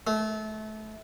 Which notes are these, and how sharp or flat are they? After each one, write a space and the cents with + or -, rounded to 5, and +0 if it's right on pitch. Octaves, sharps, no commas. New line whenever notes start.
A3 -25